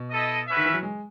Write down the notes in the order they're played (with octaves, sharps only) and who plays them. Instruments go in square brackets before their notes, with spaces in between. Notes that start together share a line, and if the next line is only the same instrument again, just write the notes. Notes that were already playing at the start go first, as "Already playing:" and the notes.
Already playing: [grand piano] B2
[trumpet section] E4 A4 D#5
C#4 F#4 B4 E5
[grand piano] D#3
E3
F#3
G#3